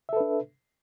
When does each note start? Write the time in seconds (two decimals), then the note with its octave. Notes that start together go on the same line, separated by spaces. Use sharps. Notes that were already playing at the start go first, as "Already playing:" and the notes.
0.09 E5
0.13 A4
0.17 B4
0.20 D4